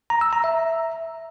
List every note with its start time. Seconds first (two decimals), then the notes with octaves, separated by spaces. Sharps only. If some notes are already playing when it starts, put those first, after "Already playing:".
0.10 A#5
0.21 E6
0.33 A#5
0.44 E5